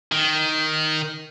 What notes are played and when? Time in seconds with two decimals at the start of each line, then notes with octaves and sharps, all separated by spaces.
0.12 D#3